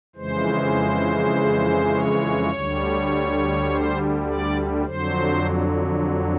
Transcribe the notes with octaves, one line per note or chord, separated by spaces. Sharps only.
F2 C#3 E3 G#3 C5
C#5
D2 D3 G3
C5
D5
F2 D3 F#3 C5